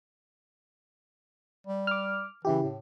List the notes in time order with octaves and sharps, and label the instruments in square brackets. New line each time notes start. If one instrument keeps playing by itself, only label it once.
[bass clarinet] G3
[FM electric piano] D6 F6
[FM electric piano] C#3 E4 G4 [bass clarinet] E3
[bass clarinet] A2